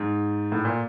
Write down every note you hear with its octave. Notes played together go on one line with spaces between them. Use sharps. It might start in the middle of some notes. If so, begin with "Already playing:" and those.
Already playing: G#2
A2
A#2